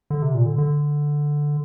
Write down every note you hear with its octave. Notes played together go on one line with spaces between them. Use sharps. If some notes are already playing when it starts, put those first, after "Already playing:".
D3
C3
A#2
D3
D3